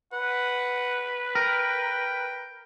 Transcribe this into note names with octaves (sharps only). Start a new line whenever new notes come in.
B4 F#5
A#4 G5